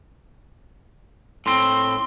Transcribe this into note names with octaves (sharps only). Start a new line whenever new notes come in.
A2 C4 C6